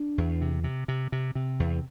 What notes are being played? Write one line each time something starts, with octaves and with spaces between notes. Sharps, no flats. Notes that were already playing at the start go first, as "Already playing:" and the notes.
Already playing: D4
E2
C3
C3
C3
C3
C3
E2